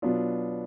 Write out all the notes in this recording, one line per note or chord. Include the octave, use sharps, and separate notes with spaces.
B2 F#3 B3 D4 F4